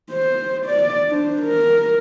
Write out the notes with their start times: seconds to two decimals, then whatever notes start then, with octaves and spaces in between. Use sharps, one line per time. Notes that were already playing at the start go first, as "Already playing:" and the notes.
0.11 C5
0.65 D5
1.09 D4 C5
1.42 A#4